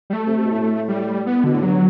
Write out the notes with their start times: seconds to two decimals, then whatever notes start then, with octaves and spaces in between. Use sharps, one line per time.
0.10 G3
0.13 A3
0.27 C3
0.38 C3
0.45 B2
0.51 A2
0.88 G3
1.26 B3
1.44 B2 D3
1.54 A2
1.63 G2 F#3